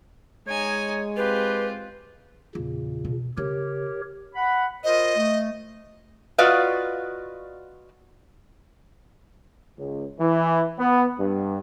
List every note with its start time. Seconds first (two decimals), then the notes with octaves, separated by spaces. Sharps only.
0.47 G#3 D#4 C#5 G#5
1.17 C4 F4 G4 B4
2.55 E2 A#2 C#3
3.05 B2
3.37 C#3 G4 A#4 C#5
4.35 F#5 B5
4.84 F4 A#4 C5 D#5
5.17 A3
6.38 F4 F#4 B4 D5 D#5 F5
9.78 C#2
10.19 E3
10.78 B3
11.18 G2